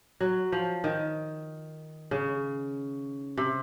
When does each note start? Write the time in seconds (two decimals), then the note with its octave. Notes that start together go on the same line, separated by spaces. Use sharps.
0.20 F#3
0.52 F3
0.84 D#3
2.11 C#3
3.37 C3